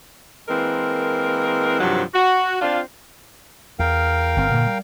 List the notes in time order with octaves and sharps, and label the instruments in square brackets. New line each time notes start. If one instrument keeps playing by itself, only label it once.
[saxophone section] E3 G#3 A#3 C4 A#4
G2 C3 D#3 F3 F#3
F#4
C4 D4 F4
[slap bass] E2 [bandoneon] A#4 F5 G5
[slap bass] G1 C4
G2 A#2 D3
G3